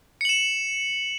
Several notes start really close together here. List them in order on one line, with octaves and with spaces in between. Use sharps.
C#7 F#7 E7